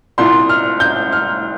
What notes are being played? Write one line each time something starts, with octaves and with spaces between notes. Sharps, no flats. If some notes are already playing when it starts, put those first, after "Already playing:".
C2 A#2 C6
F6
G6
F6